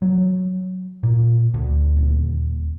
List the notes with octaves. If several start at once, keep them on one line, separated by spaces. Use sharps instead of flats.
F#3
A#2
D2
D#1